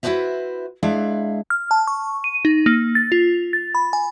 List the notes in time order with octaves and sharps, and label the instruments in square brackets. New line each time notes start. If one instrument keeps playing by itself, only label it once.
[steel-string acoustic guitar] E4 F#4 G4 B4 C5 E5
G#3 D4 E4 E5 F5
[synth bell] F6
A5
C#6
D#7
D#4
A#3
A6
F4
A6
B5
G#5